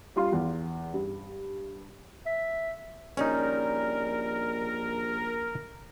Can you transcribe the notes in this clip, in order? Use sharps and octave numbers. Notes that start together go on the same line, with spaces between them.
G3 F4 C6
E2
G2
E5
A#1 G3 G#3 C#4 D#4 A#4